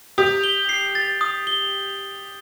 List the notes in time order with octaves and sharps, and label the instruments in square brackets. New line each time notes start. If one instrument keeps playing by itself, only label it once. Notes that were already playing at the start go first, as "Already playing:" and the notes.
[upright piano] G4 [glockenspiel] D#6
[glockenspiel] G7
C7
A6
D#6
G7